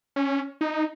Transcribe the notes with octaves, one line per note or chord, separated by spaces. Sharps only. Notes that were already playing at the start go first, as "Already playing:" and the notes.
C#4
D#4